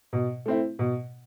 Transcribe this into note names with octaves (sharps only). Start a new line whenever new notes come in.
B2
A3 C4 E4
B2